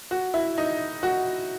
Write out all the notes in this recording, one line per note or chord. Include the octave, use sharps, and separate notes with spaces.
F#4
E4
D#4
F#4